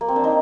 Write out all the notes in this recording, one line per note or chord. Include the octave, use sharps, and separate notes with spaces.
A#3
C4
D4
D#4